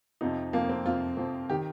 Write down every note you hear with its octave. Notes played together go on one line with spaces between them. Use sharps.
F2 C3 F3 D#4
F2 C3 F3 A#3
C4
F2 C3 F3 F4
F2 C3 F3
D#3 G4